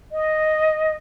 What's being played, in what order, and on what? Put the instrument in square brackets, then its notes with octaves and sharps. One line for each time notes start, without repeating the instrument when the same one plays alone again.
[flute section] D#5